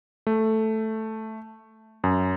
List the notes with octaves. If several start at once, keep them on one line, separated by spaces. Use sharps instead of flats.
A3
F#2